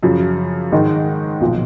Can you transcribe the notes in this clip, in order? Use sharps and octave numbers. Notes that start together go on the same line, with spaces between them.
F#2 C#3 F3
G#2 D#3 G#3 D#4
B1 A#2 F3